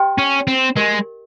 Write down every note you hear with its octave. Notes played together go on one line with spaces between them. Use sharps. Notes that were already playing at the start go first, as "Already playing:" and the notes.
Already playing: G4 C5 D#5 G5 C6
C#4
C4
G#3 G4 A#4 D#5